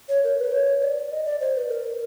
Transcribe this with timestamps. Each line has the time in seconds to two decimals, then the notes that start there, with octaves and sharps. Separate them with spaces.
0.09 C#5
0.24 A#4
0.39 B4
0.52 C#5
0.82 D5
1.11 D#5
1.26 D5
1.41 C5
1.55 B4
1.69 A#4